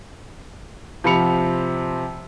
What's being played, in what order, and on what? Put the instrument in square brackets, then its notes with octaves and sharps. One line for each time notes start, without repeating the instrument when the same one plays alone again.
[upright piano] C3 F3 C4 B5 C#7 F7